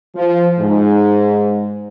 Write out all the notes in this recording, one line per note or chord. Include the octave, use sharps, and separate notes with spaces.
F3
G#2